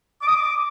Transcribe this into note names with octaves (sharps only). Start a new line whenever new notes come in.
D6
D#6
D6